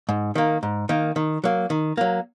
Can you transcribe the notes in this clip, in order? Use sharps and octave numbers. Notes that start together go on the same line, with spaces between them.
G#2
D#3 A#3
G#2
D#3 A#3
D#3
F#3 A#3
D#3
F#3 A#3